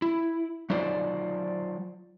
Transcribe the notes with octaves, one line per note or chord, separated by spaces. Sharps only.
E4
F#3 D#4 F4 C5 D5